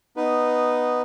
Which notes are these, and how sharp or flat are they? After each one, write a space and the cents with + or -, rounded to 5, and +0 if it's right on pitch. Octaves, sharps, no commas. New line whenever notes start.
B3 +0 D#4 -10 B4 +0